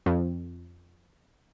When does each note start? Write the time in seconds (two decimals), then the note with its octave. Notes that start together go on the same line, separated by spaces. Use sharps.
0.06 F2